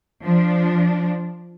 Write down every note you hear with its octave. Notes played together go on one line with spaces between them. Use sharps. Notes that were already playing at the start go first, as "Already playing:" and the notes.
F3 D4